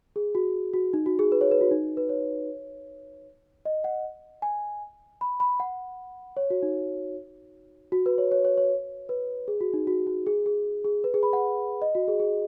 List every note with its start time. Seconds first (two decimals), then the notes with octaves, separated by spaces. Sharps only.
0.16 G#4
0.35 F#4
0.74 F#4
0.93 D#4
1.06 F#4
1.19 G#4
1.32 B4
1.41 C#5
1.51 B4
1.61 F#4
1.71 D#4
1.97 B4
2.09 C#5
3.65 D#5
3.84 F#5
4.42 G#5
5.21 B5
5.40 B5
5.60 F#5
6.37 C#5
6.50 F#4
6.63 D#4
7.92 F#4
8.06 B4
8.18 C#5
8.32 C#5
8.45 C#5
8.57 C#5
9.09 B4
9.48 G#4
9.61 F#4
9.74 D#4
9.87 F#4
10.07 F#4
10.27 G#4
10.46 G#4
10.85 G#4
11.04 B4
11.14 G#4
11.23 B5
11.33 F#5
11.82 D#5
11.95 F#4
12.08 G#4
12.20 G#4